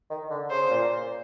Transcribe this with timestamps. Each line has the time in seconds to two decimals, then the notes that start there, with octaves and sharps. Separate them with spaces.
0.10 D#3
0.31 D3
0.50 C#3 C5
0.70 A#2